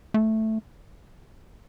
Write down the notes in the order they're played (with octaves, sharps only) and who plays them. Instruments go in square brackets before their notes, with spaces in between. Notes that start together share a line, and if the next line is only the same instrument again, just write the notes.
[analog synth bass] A3